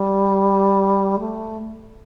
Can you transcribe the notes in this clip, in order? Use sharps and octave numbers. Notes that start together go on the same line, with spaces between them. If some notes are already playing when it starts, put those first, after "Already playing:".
Already playing: G3
A3